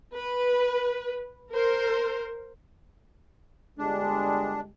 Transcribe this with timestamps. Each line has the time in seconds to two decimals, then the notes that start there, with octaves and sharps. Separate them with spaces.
0.14 B4
1.51 A#4 C5
3.78 G1 G3 G#3 D4